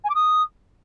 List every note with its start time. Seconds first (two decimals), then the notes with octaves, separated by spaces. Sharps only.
0.04 G#5
0.09 D6
0.15 D#6